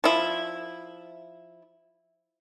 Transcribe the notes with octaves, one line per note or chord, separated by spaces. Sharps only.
F3 E4